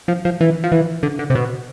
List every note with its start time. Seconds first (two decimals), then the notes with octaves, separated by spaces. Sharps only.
0.08 F3
0.25 F3
0.41 E3
0.64 F3
0.72 E3
1.03 D3
1.19 D3
1.30 C3
1.35 B2